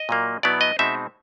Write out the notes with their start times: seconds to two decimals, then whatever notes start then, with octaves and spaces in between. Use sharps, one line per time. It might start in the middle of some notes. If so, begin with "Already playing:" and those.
Already playing: D#5
0.09 A#2 F#3 A#3
0.43 B2 F#3 B3 E4 D5
0.61 D#5
0.79 B2 G#3 C4 D#4 E5